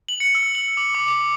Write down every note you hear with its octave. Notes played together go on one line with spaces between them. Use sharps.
F#7
C#7
E6
F#7
D6
D6
D6